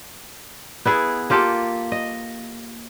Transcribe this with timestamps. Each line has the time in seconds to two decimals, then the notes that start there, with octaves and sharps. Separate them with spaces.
0.85 B3 E4 G#4
1.30 A#3 F4 G4 A4
1.92 D#5